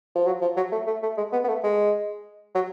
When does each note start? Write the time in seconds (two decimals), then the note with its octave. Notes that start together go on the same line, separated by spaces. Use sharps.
0.15 F3
0.27 F#3
0.42 F3
0.57 F#3
0.72 A3
0.87 A3
1.03 A3
1.17 G#3
1.33 B3
1.44 B3
1.49 A3
1.64 G#3
2.55 F#3